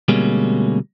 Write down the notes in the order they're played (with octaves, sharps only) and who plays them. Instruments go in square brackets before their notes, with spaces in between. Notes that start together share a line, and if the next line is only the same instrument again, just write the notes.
[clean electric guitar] D2 B2 G3 G#3 A#3 C#4